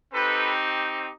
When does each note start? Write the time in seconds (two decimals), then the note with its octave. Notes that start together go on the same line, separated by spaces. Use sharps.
0.13 C4 D#4 G4 A4 B4